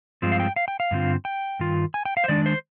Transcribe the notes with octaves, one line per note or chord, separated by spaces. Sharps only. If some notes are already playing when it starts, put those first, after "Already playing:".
G2 F3 G#3 C4 F4
F5
G5
F5
G5
F5
G2 D3 G3 C4 F4
G5
G2 D#3 F4
G#5
G5
F5
C5
D#3 G#3 D4 D5
C5